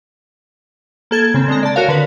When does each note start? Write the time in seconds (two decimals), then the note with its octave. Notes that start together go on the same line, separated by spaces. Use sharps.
1.11 A#3 A4 G#6
1.34 C#3 C4
1.48 D3 G#3 A4 A#5
1.63 D5 A5
1.76 F#4 A#4 C#5 F5
1.88 D3 B4